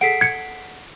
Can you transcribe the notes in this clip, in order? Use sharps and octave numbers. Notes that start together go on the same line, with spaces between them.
G#4 A4 F#5 B6 C7 D7
G#6 C#7